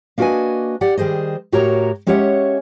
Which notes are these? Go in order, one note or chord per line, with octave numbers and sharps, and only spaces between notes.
A#3 D4 F#4 B4 D#5 G#5
G4 D5 F#5
D#3 G3 G#4 C5 D#5
A2 F#4 G4 A#4 C#5 A#5
G#3 C#4 G4 C#5 E5 F#5